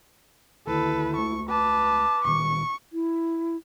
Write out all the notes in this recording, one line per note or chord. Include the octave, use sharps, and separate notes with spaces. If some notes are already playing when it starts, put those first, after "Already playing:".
D2 D#3 E4 A4 B4
C#2 A3 C#6
B4 A5 D6
C#2 A#2 D#3 C#6
E4